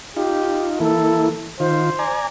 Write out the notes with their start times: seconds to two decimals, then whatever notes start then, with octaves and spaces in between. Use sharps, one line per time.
0.17 D#4 F4 G4
0.80 E3 A#3 E4 A4
1.60 D#3 F4 C5
1.99 D5 G#5 A#5